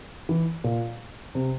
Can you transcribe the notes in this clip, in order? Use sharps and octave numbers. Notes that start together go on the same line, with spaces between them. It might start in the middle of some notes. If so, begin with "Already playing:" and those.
E3
A#2
C3